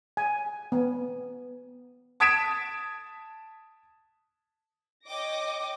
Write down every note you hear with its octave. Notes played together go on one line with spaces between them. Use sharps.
G#5
B3
A5 D#6 G#6 B6 D7 E7
C#5 D#5 G5 D6 A#6